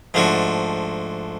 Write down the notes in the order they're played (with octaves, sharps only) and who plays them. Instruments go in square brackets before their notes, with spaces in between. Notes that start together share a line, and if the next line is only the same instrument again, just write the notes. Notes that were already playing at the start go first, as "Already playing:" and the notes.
[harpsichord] G#2 F3 A3 D4 F#4